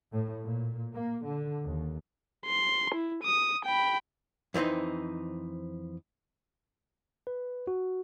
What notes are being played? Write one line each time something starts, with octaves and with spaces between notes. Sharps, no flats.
A2
A#2
A#3
D3
D#2
C6
E4
D#6
G5 B5
F2 E3 A3 C4 D#4
B4
F#4